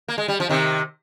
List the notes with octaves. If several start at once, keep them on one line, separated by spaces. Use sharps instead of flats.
A#3
G#3
G3
F3
C3 D#3